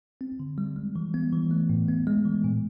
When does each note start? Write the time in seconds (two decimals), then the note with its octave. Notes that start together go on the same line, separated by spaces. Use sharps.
0.21 C4
0.40 D3
0.58 G3
0.76 G#3
0.96 E3
1.14 B3
1.33 E3
1.51 A3
1.70 A2
1.88 B3
2.07 G#3
2.25 E3
2.44 A#2